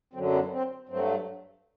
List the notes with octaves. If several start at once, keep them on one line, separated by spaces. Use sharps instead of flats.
F#2 D3 F#3 C4
B3
C4
G2 F#3 A3 C4